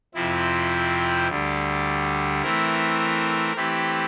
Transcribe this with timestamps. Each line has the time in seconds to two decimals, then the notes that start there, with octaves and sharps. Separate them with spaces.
0.14 F2 C3 F3 C4 E4
1.28 D2 D3 G3
2.42 E3 A3 C4 E4 A#4
3.56 E3 A3 C4 E4 G4